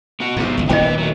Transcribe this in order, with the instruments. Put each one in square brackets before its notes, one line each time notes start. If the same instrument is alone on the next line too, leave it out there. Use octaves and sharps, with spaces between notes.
[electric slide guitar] B3 F#4 F#5
[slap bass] G#2 C3 [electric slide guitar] F#3 B3
[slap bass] G1 C#2
[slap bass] D#1 D#3 D4 [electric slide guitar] D3 B3 C#4 [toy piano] D#5 G5
[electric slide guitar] E4 B4
F#3 A3